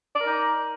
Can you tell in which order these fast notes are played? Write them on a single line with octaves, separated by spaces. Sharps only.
D5 A#4 D#4